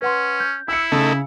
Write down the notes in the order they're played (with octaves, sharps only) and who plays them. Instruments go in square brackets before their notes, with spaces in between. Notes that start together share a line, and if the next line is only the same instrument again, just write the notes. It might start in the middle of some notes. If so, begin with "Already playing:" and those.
[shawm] C#4 [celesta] B4 F#5 C6
[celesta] G6
[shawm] E4 [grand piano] E6 C#7
[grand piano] C#3 [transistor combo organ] A3 D#4 A4